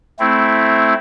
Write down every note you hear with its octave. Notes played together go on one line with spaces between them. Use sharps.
A3 C4 E4